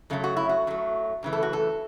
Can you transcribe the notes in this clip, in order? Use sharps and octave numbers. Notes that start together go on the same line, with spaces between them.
F#2 C#3 F#3 A3 A4
F#4
E4
F#4
F#2 F#3 A3
F#2 C#3 E3 A3
A4
F#4
A4